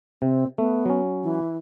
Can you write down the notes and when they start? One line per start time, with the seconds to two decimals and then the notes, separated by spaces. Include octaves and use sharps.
0.22 C3 C4
0.58 A3 B3
0.86 F#3 C#4
1.23 E3